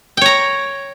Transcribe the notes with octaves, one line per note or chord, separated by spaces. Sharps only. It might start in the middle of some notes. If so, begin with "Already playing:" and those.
C#5 G5 A#5